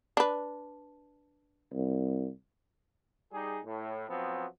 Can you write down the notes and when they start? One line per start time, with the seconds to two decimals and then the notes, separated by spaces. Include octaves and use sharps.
0.17 D4 B4
1.73 C2
3.33 G3 D#4 G#4
3.65 A2
4.09 F3 F#3 B3 C4